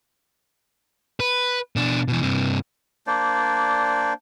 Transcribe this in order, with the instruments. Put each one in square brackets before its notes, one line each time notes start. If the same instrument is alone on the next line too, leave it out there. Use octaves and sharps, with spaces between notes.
[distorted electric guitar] B4
B2 D4
B2 E3
G2 C3
[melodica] A#3 D4 C5 D5